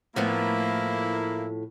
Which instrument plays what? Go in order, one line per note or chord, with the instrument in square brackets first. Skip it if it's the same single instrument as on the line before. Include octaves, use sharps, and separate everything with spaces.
[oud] A2 F3 B3 [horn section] A#3 E4